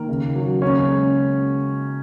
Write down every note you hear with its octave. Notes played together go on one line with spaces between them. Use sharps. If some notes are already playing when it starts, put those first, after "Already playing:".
Already playing: D#3 A#3 A#4
C#3
F#3
C#3 C#4
G#3